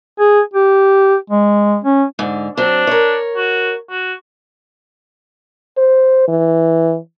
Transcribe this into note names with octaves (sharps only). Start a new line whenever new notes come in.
G#4
G4
G#3
C#4
G#2 D3
F#3 C4 D4
A#4 C#5
F#4
F#4
C5
E3